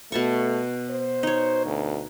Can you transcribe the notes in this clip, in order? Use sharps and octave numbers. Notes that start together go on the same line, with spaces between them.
B2 A3 A5 C#6
C5
D#4 C#5
D2